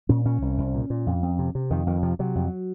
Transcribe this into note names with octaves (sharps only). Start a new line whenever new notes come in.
A#2 C#4
A#2 C#4
C2
C2
A#2
A#2
F2
F2
C3
C3
F2 D#3
F2 D#3
C3 F3
C3 F#3
F2